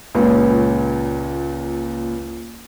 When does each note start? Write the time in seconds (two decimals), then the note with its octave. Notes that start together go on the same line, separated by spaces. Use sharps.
0.15 C#2 A#2 C#4